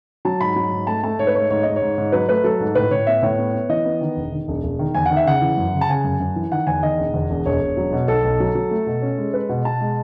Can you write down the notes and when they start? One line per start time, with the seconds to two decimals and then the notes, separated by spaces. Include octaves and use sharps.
0.25 F#3 A5
0.41 G#2 B5
0.56 F#3
0.72 G#2
0.87 A3 A5
1.03 A3 A5
1.19 G#2 C#5
1.27 B4
1.35 A3 C#5
1.50 G#2 C#5
1.63 G#2 D#5
1.76 C#5
1.82 G#2
1.98 G#2
2.12 F#3 B4
2.29 A3 B4
2.44 F#3 A4
2.60 G#2
2.75 A2 B4
2.91 A2 C#5
3.07 B3 E5
3.22 A2 C#5
3.38 B3
3.54 B3
3.69 E3 D#5
3.85 B3
4.01 D#3
4.17 E1
4.32 D#3
4.48 E1
4.64 E1
4.79 D#3
4.95 E2 G#5
5.06 D#3 F#5
5.16 E5
5.26 C#3 F#5
5.41 E3
5.58 F#2
5.73 C#3
5.81 A5
5.89 C#3 G#5
6.04 F#2
6.20 F#2
6.36 E3
6.52 D#3 F#5
6.67 E2 G#5
6.83 D#3 D#5
6.99 E1
7.14 E2
7.30 E1
7.46 E1 C#5
7.61 E1
7.77 F#3
7.92 B2
8.08 B1 A4
8.24 B1
8.40 F#3
8.55 F#3
8.71 A3
8.86 B2
9.02 C#4
9.18 G#3
9.34 G#3 B4
9.49 B2
9.65 B2 A5
9.80 G#3